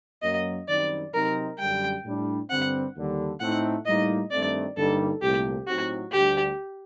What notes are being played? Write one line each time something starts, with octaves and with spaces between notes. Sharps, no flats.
F#2 F#3 A#3 D#5
F#2 D#3 G3 C4 D#4 D5
C3 F#3 C4 D#4 A#4
F#2 D3 G3 G5
A2 G3 D4
G2 D3 G3 C4 F#5
D#2 D3 G3
A2 A3 C4 D#4 F#5
A2 G3 A#3 D#4 D#5
G2 D#3 A3 C4 D5
G2 D3 G3 A#3 D#4 A4
C2 A#2 A3 G4
A2 F#3 C4 D#4 F#4
D2 D3 G3 G4